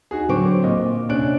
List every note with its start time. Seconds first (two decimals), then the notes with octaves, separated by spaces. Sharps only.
0.11 D#4 F#4 G#4
0.29 D3 F#3 C4 C#6 D6 D7
0.64 A#2 D#5
1.09 C3 C#4 D4 D5 F#6 D7